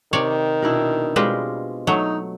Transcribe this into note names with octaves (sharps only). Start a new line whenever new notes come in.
C3 D#3 C#5 D5
B2 D4 E4
B2 G3 G#3 C4 F4 B4
F#3 A3 D#4